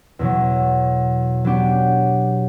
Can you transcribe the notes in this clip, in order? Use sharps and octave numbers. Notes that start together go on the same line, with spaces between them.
E2 B2 F#3
F#3 B3 D4 G4